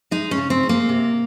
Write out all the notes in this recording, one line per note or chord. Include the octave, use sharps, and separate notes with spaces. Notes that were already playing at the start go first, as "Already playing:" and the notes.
G#3 D#4
C#4
C#3
C4
G#3
A#3
C3